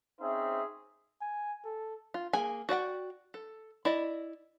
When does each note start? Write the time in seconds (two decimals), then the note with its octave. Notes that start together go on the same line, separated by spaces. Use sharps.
0.20 C4 C#4 D#4 G#4 C5 E5
1.21 G#5
1.65 A4
2.14 F4
2.33 A#3 G#4 G#5
2.69 F#4 D5 F#5 G5
3.34 A4
3.85 E4 D5 D#5